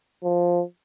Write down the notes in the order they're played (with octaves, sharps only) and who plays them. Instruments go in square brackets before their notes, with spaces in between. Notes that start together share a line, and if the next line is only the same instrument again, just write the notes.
[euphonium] F3